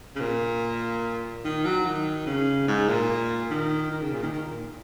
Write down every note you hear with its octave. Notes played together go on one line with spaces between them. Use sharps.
C#3
A#2
D#3
F#3
D#3
C#3
G#2
A#2
D#3
D#3
C#3
A#2
D#3
D#3
A#2